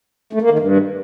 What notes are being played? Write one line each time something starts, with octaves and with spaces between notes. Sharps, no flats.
A3
A#3
D#3
G2